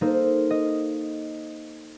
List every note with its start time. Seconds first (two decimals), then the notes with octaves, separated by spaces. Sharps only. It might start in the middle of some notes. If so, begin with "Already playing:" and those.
0.01 A#3 D#4 A4 C5
0.51 D#5